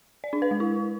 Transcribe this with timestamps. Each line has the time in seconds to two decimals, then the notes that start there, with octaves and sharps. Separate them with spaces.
0.24 D5
0.33 D4
0.42 B4
0.51 G#3
0.60 E4